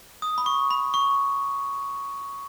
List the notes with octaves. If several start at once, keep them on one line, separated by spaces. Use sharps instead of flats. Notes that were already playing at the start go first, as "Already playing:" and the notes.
D#6
B5
C#6
B5
C#6